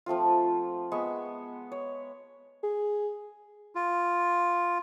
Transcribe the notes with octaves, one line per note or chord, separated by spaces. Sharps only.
F3 A3 C4 F4
G#3 B3 E5 C#6
C#5
G#4
F4